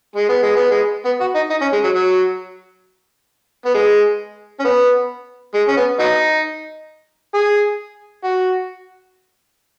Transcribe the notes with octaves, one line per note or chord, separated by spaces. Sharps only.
G#3
B3
G#3
B3
G#3
B3
F#4
D#4
D#4
C#4
G#3
F#3
F#3
B3
G#3
C#4
B3
G#3
C#4
B3
F#3 B3 D#4
G#4
F#4